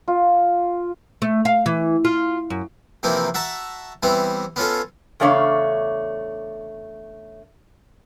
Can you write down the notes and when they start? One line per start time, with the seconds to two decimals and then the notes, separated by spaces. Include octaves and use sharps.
0.08 F4
1.22 A3
1.45 F5
1.66 E3
2.05 F4
2.50 F#2
3.03 C3 E3 F3 A#3 D#4
3.34 F#4 E5 A5 A#5
4.03 E3 G3 B3 C4
4.56 B3 C#4 F4 A4
5.20 E2 C#3 A3 D4 C#5 F5